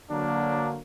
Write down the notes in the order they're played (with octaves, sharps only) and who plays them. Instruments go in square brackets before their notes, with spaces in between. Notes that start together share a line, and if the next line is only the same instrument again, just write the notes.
[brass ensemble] D3 F#3 A#3 [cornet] D4